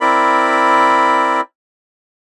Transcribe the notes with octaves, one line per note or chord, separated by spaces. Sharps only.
C4 E4 A#4 D5 B5